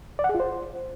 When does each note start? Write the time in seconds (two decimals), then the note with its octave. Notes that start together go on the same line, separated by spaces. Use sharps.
0.19 D5
0.24 F#5
0.29 G#4
0.35 F4
0.40 C5